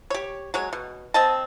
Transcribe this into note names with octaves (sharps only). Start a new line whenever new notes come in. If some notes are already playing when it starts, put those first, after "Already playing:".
G4 C#5
F#3 G#3 C#5
B2
C4 D#5 A5